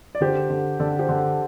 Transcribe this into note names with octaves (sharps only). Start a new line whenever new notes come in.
D5
D3 G4 C5
D3
D3 A4 D5
G4 C5
D3